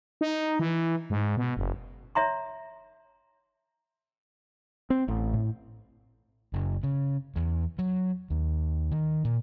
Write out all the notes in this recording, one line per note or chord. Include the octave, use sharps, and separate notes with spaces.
D#4
E3
G#2
B2
F#1
C#5 E5 A#5 C6
C4
A1
A2
F#1
C#3
E2
F#3
D#2
D#3
A#2